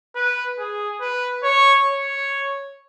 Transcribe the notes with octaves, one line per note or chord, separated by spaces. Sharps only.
B4
G#4
B4
C#5
C#5